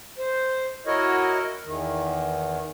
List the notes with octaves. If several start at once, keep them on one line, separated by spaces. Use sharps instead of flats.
C5
E4 F#4 A#4 C#5 D#5
E2 D#3